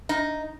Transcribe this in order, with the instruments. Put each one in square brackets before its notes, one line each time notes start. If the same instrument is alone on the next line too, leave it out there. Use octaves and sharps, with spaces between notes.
[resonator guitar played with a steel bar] D#4